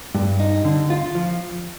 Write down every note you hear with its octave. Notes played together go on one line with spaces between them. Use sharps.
G2
D#4
D3
F4
F3